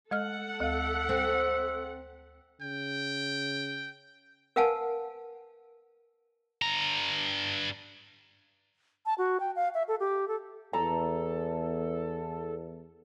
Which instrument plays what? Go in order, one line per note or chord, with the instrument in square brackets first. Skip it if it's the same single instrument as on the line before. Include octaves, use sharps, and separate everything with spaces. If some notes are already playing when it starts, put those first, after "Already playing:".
[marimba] G#3 D#5 F6 [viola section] A4 F#5
[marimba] D2 F5 [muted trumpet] E5
[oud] C4
[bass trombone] C#3 [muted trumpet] G5
[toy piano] A#4 B4 F5 F#5 G#5 A5
[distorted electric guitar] G2 A#5
[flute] A5
F#4
G5
F5
E5
A4
G4
A4
[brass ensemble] E2 [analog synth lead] A4 [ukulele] A#5